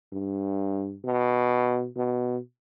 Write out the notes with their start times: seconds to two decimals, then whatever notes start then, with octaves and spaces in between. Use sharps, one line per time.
0.13 G2
1.05 B2
1.96 B2